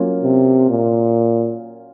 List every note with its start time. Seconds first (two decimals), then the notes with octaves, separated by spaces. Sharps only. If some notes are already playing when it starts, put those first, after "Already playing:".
Already playing: F#3 A#3 C#4 F4
0.23 C3
0.70 A#2